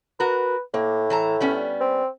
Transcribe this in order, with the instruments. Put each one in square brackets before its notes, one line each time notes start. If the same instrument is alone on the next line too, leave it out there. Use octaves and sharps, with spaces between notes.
[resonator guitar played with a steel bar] F#4 A#4 [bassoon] B4
[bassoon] A2 [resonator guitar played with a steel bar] A#3
[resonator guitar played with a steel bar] E3 A5 A#5
G3 B3 C#4
[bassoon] C4